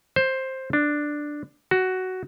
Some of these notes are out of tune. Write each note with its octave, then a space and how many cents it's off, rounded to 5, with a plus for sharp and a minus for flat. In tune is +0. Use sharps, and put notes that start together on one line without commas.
C5 +10
D4 +5
F#4 +10